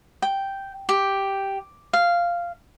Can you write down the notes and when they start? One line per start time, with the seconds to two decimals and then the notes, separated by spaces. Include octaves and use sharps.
0.22 G5
0.89 G4
1.93 F5